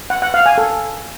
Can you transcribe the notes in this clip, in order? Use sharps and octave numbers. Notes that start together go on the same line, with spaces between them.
F#5
F#5
F5
G#5
A4